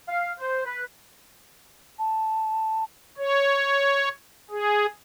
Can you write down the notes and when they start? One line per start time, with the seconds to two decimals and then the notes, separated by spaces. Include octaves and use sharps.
0.08 F5
0.40 C5
0.65 B4
1.99 A5
3.18 C#5
4.50 G#4